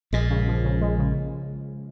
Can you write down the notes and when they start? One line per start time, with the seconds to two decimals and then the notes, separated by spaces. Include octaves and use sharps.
0.13 A#1 A#2 G#3
0.30 C#3
0.48 F3
0.64 C#3
0.81 G#3
0.99 C#3